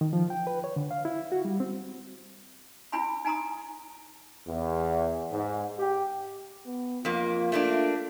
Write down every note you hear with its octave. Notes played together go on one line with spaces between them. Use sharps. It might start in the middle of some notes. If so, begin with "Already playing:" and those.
D#3
F3
G5
B4
C#5
D3
F5
E4
F#4
G3
C4
D4 E4 F4 G#5 B5 C6
D#4 G#5 A#5 C6 D#6
E2
G#2
G4
B3
F2 A#3 F4
A3 A#3 D4